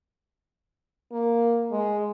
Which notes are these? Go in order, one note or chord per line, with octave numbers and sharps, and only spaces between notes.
A#3
G#3